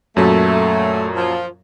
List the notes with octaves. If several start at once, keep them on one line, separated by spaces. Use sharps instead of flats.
F#2 A#2 F#3 A3
F3